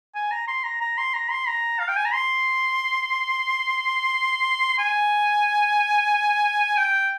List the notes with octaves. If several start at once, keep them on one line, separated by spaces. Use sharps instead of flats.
G#5
A#5
C6
A#5
A#5
C6
A#5
C6
A#5
F5
G5
G#5
A#5
C6
G#5
G5